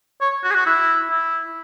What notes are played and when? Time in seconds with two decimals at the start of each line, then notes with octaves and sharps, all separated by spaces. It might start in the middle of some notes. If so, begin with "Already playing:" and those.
0.21 C#5
0.44 F#4
0.51 G#4
0.55 F#4
0.66 E4
1.11 E4